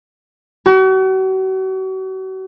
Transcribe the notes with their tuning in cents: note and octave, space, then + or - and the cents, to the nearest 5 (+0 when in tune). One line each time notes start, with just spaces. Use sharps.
F#4 +40